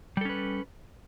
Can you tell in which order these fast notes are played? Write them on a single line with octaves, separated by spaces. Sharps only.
G3 A4 C#4 B4